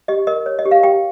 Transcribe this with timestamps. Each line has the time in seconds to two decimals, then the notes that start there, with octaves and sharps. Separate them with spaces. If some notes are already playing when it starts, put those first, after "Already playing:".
0.08 G4 D#5
0.27 A#4 D#5
0.46 C#5
0.59 D#5
0.66 G4
0.71 F5
0.83 G4 G5